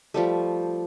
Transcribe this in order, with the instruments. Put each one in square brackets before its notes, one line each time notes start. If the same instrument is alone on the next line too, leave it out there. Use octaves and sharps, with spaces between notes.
[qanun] F3 G3 A3